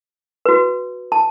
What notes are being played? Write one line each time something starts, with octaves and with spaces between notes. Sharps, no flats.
F#4 B4
A5